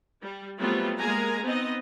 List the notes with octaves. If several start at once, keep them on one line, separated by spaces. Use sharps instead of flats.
G3
F#3 G3 A3 B3 C4 F4
G#3 A#3 G#4 A#4 G#5 A#5
B3 C4 D#4 D#5